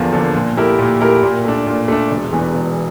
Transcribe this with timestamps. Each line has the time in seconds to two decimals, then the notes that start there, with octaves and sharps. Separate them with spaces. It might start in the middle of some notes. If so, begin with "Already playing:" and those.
Already playing: E2 D3 F3 A#3
0.13 D3 F3 A#3
0.35 A#2
0.57 A3 E4 G4 A#4
0.79 A#2
1.01 A3 E4 G4 A#4
1.23 A#2
1.45 A3 D4
1.67 A#2
1.88 A3 D4
2.11 E1
2.33 E2 E3
2.54 E1